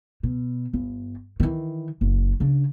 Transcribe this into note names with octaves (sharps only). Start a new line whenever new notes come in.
B2
G1
D#3 E3
F#1
C#3 D4